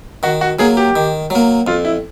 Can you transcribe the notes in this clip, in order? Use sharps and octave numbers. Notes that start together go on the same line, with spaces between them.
D#3 F#4
F#4
F#3 A#3 G#4
G4
D#3
F#3 A#3
F2 F4
E4